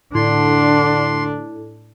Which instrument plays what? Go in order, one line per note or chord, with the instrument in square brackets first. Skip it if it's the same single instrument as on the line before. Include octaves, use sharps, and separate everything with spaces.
[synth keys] A2 [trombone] D3 [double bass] D4 [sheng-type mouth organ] C6